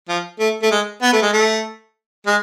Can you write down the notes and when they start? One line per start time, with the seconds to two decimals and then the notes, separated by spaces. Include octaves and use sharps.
0.09 F3
0.40 A3
0.63 A3
0.72 G#3
1.02 B3
1.13 A3
1.23 G#3
1.33 A3
2.27 G#3